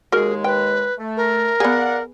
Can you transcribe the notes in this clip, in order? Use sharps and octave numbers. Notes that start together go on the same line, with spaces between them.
D#2 G#3 F#4 G#4 A#4
B4 G5
A3
A#4
B3 G#4 D5 F5 F#5